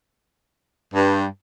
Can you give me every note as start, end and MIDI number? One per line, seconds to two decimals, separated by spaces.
0.94 1.26 43